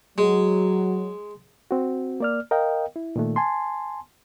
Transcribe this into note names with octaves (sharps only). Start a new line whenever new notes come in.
F#3 G#3
C4 F#4
A#3 D5 F6
A#4 D#5 F5 G5
E4
A#2 D#3 A3
G#5 A5 C6